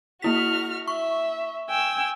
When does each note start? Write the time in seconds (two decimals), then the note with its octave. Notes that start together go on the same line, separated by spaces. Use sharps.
0.22 A#3 E4 F#4 F6 B6
0.88 E5 C#6
1.68 G5 G#5 E6